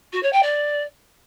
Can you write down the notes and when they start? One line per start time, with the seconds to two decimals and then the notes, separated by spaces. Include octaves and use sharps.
0.13 F#4
0.23 C#5
0.32 G5
0.42 D5